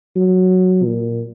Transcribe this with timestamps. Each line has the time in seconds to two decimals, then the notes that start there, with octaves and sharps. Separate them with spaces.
0.16 F#3
0.85 A#2